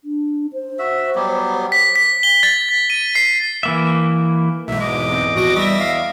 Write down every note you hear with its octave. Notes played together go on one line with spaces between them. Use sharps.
D4
C5
F#4 E5
F#3 G3 B3
B6
B6
G7
A6
B6
D#7
C7
E3 A#3 E5
B1 G#2 E5
E2 D#5 D6
C4
A#1 F#4 D6 A#6
G3 E5 D6 A#6
F5